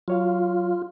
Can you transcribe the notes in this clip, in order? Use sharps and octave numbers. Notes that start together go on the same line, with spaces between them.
F#3 F4 C#5 F5